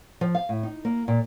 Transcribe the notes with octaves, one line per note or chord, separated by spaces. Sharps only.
F3
F5
A2
D#4
A#3
A#2